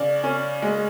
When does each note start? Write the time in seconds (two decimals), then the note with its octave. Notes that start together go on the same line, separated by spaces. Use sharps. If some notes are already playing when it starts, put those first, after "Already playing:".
Already playing: C#3 D5
0.24 C#4
0.62 G#3